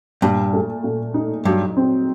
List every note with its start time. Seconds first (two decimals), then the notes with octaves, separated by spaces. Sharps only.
0.22 G2 A#2
0.53 A3
0.84 A#2
1.14 D#4
1.45 G2 F#3
1.77 C4